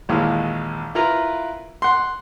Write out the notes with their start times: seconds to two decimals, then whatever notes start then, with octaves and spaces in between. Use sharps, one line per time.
0.09 A#1 D#2 E3 G#3 F5
0.95 E4 F4 A#4 B4 F5 A#5
1.82 F#5 C6